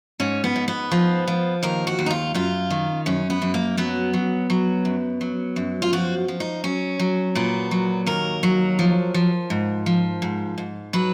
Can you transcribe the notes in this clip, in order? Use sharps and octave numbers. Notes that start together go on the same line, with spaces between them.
G#2 C#4
B3
G#2
B3
F3
F3
D#2 A#4
F#4
D#2
D#4
F4
F#2 F4
D#3
F#2 C#4
B3
F#2
A#3
F#3 B3
F#3
F#3
F#2
F#3
F#2
F4
F3 F#4
F3
D#4
F#3 C#4
F#3
A#2 B3
F#3
D#2 A#4
F#3
F3
F3
G#2
F3
G#2
G#2
F#3 B4